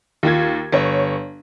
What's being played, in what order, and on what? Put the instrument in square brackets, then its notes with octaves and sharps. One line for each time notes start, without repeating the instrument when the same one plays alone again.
[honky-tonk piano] D#2 F4 G#6
G1 C#5